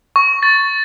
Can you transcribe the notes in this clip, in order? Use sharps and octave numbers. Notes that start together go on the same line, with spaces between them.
C#6
A6